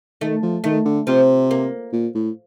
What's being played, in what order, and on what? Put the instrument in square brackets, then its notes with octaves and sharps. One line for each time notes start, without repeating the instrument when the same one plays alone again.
[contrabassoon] D#3 [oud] A3
[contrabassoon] F3
[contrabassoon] D#3 [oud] A3
[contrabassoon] D3
[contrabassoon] C3 [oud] F3
[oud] A#3
[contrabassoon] A#2
A2